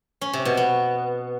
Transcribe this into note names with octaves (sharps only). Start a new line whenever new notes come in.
C#4
C3
B2
B3